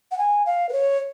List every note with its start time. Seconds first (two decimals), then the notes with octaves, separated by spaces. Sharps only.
0.11 F#5
0.18 G#5
0.46 F5
0.69 B4
0.73 C#5